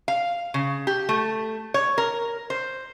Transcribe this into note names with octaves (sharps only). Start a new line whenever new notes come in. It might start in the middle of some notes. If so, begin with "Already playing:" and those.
F5
C#3
G4
A3
C#5
A#4
C5